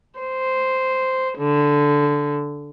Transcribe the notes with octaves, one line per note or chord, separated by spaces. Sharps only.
C5
D3